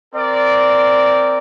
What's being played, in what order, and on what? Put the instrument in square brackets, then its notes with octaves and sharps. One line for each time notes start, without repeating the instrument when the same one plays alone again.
[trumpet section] C4 A#4 D5